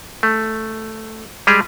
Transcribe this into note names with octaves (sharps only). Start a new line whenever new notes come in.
A3
G3 G#3 G4 G#4